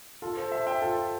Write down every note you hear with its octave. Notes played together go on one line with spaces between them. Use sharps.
F4 A4
A4 C5
C5 E5
E5 G5
F4 A4